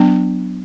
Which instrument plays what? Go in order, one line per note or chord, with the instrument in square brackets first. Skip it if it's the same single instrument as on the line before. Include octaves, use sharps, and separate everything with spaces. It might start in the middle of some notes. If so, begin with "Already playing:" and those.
Already playing: [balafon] F#3 B3 D4